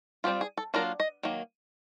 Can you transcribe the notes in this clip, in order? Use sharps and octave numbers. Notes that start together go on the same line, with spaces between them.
G3 C4 F4 G4
G#4
A4
F#3 A#3 D4 F4 A#4
D#5
D#3 F#3 A#3